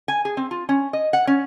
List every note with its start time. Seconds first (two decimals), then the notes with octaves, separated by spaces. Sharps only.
0.08 G#5
0.25 G#4
0.37 C4
0.51 F4
0.69 C#4
0.93 D#5
1.13 F#5
1.27 C#4